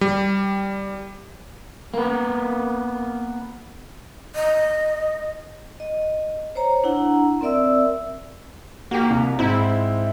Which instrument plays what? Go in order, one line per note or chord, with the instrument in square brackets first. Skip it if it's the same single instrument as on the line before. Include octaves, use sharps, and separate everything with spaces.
[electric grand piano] G3
[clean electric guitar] A#3 B3
[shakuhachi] D#5
[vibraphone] D#5
C5 C#5 A#5
D4 E4 F#5 A#5
C4 A#4 D5 E5 E6
[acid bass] A#3 [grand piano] F#4 G4
[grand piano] C2
[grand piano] G#2 C4 [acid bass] E4